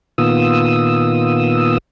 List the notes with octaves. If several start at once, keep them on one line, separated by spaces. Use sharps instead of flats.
A#2 D#3 B3 F4 D#6 E6